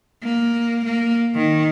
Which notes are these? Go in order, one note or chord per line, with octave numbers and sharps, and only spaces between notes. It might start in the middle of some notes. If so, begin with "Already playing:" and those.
A#3
A#3
D#3